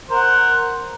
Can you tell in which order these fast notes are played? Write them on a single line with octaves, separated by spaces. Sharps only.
C5 A#4 F#5